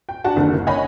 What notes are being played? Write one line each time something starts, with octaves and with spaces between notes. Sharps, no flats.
G5
D4 F#4 F#5 A5
F#1 D#2 D3
F#1
C#5 D#5 F#5 G#5 B5